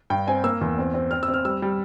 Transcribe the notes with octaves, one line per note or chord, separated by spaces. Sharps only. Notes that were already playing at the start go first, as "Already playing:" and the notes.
G2 G5
C4 G#5
A#3 E6
E2
C4
C4
C4 F6
E6
C4
F6
G3 E6
G3